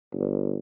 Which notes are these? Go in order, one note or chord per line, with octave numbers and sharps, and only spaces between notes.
G1